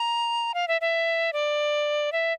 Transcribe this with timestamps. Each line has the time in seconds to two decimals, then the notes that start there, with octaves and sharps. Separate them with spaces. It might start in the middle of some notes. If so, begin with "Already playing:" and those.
Already playing: A#5
0.54 F5
0.68 E5
0.81 E5
1.33 D5
2.12 E5